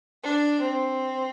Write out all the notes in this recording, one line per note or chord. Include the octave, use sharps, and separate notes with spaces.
D4
C4